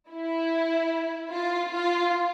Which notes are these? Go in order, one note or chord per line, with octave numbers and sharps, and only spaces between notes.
E4
F4
F4